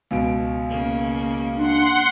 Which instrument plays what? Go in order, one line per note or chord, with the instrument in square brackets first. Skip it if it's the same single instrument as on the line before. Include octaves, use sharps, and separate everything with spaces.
[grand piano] C#2 B2 D7
[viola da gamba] C#3 A#3
[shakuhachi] D4 [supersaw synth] F#5 C6 C#7